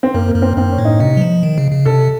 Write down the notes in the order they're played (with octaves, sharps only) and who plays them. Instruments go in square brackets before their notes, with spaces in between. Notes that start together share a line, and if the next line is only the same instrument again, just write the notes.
[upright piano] C4
[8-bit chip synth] F#2 [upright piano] A#3
[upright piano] A#3
[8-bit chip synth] F#2
[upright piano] C4
[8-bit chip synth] F#2 [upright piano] C4
[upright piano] C#4
[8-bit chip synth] A2
[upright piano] D#4
[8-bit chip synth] C3 [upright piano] D#4
[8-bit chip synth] F#3
F3
D#3
C#3
C#3
[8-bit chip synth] C3 [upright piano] A4